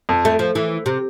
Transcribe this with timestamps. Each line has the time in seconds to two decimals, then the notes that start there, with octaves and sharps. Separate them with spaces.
0.09 F2
0.25 A3
0.39 F3
0.55 E3
0.86 C3